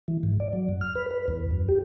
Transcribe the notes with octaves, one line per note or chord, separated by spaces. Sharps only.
E3
G#2
D5
F#3
F#2
F6
B4
B4
E2
F#2
G4